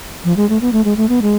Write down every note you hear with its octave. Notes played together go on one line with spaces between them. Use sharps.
F3
G#3
A3
B3
A3
G#3
A3
B3
G#3